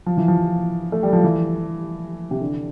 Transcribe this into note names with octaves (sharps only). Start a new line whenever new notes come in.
F3
E3
F3
A3
G3
F3
E3
C3
D3